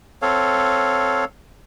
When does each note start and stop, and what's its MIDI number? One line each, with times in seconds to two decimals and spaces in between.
0.22 1.25 60
0.22 1.25 69
0.22 1.25 73
0.22 1.25 77